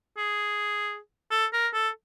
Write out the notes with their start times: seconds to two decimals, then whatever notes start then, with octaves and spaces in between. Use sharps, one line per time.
0.17 G#4
1.31 A4
1.53 A#4
1.74 A4